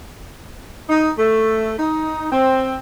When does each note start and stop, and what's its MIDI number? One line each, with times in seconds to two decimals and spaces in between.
0.89 1.10 63
1.18 1.72 57
1.77 2.25 63
2.31 2.75 60